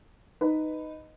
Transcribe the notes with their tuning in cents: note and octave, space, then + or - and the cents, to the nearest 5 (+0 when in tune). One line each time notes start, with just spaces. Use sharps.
D#4 +0 B4 +15